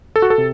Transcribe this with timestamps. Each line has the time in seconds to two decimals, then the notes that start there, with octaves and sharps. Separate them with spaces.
0.16 A4
0.22 F#4
0.30 A4
0.38 C3